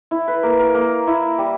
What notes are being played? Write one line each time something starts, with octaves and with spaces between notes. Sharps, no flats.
E4
B4
A#3 A#4
A#4
A#3 A#4
E4
G3